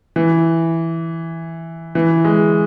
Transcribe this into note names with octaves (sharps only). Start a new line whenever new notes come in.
E3
E3
G#3